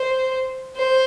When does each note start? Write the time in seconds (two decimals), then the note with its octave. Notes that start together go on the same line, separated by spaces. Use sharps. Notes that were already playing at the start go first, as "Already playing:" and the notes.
Already playing: C5
0.76 C5